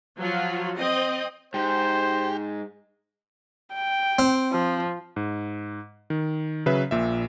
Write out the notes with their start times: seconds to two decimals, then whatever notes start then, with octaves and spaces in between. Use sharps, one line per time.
0.19 F3 F#3 F4 F#4
0.77 C4 D#5
1.54 G#2 G4 C5
3.73 G5
4.19 C4
4.52 F3
5.16 G#2
6.10 D#3
6.66 C#3 F#3 B4 E5
6.91 A#1 A#2 E5